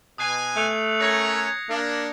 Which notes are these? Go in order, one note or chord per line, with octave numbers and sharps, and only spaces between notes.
B2 G#5 D#6 F#6 C7
A3 F#6 F7
C#4 A#4 C#5 G#6 A#6 C#7
A#3 D4